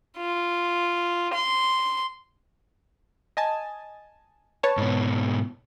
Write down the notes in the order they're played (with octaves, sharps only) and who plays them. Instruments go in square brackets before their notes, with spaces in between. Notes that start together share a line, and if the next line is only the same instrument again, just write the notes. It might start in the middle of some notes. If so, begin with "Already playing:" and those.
[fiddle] F4
C6
[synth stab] D#5 G#5 A5
B4 C#5 A5
[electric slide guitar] G#2 B2